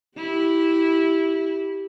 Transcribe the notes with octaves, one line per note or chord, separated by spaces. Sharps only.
E4 G4